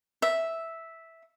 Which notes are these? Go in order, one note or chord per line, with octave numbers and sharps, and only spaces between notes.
E5